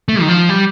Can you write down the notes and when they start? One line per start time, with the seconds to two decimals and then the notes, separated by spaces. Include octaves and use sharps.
0.08 A3
0.21 D#3
0.28 F3
0.49 G3